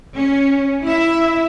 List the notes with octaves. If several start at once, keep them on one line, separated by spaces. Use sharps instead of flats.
C#4
E4 E5